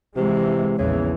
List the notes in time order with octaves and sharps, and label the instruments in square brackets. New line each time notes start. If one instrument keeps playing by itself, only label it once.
[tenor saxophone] C3 [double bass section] E3 G#3
[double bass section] A#1 E2 E3 [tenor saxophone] C#3